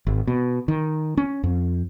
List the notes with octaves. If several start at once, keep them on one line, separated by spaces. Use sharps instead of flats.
G#1
B2
D#3
C#4
F2